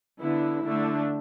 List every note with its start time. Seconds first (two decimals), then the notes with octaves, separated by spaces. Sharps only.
0.20 D3 B3 D4 E4
0.64 D3 A3 D4